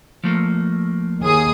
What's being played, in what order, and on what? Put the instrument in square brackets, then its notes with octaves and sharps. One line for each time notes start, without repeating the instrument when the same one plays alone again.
[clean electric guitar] F3 A3 A#3
[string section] D#2 G#4 D#6